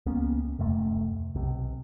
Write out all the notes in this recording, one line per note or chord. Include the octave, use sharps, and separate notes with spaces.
C#2 A#3 B3 C#4
D1 F2 C3 A3
B1 C3